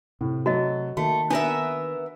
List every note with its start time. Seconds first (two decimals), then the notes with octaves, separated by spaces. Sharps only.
0.21 A2 C3
0.46 F#3 A3 F#4 D#5
0.97 D#3 A3 A#3 F#4
1.31 B3 D4 A#4 E5